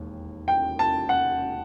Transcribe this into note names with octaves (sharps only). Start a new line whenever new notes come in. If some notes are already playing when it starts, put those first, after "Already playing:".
Already playing: E1 D#2
G5
A5
F#5